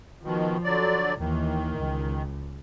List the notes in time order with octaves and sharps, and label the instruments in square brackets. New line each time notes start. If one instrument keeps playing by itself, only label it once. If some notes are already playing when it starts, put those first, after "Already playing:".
[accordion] B2 D#3 [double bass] F3
[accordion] D3 F#3 D5
[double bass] D#2 E3 [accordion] D#3
[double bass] C#2